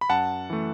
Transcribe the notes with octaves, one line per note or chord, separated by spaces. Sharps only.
B5
F#2 F#5 A5
E3 A3